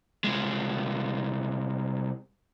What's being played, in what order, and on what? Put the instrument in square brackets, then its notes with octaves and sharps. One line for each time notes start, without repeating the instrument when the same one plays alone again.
[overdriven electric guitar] C2 G#3